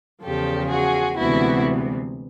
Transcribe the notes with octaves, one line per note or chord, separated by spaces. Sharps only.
E2 C#3 F3 G4 A4
F#4 G#4
D2 C3 E3 G#3 B3 E4 F#4